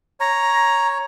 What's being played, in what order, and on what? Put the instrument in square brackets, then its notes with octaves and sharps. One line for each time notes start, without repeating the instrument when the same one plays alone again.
[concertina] C#5 [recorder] A#5